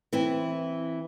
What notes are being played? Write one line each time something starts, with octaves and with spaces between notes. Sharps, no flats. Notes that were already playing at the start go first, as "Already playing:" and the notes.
E3 C4 E4